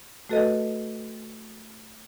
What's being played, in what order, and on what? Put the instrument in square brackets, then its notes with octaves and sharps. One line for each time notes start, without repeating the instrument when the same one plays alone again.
[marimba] A3 F#4 A4 B4 D#5